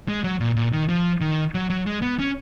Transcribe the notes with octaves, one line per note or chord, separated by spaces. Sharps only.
G#3
F#3
A#2
A#2
D#3
F3
D#3
F#3
F#3
G#3
B3
C#4